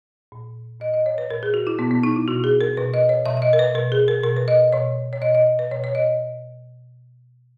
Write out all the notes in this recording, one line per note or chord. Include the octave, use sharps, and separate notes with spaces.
A#2
A#2 D#5
D#5
C#5
B4
A#2 A#4
G#4
F#4
E4
B2 B3
B3
D#4
E4
B2 F#4
G#4
A#4
B2 B4
D#5
C#5
B2 E5
E5
D#5
A#4
B4
B2 A#4
G#4
A#4
B2 A#4
B4
D#5
B2 C#5
C#5
B2 D#5
D#5
B4
B2 C#5
C#5
D#5